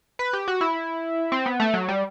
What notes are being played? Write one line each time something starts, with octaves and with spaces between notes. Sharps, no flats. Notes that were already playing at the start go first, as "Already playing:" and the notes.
B4
G4
F#4
E4
C4
B3
A3
F#3
G3